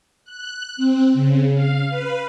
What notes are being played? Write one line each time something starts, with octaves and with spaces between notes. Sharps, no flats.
F#6
C4
C#3
F5
B4